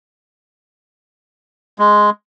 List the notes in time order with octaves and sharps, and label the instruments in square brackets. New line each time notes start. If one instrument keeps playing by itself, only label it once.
[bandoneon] G#3